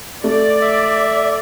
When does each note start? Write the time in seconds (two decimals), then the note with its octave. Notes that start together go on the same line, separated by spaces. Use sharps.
0.24 A3 D5
0.61 E5